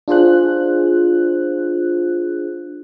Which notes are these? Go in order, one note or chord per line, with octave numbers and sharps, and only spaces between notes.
D4 F4 G#4 C5 F#6